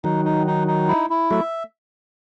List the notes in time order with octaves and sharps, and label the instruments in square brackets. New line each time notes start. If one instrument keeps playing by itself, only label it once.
[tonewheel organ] D#3 F#3 [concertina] D#4
[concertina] D#4
D#4
D#4
E4
E4
[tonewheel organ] F#3 A3 [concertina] E5